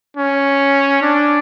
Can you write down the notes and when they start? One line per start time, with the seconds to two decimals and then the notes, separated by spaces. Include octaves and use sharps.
0.17 C#4
1.02 D4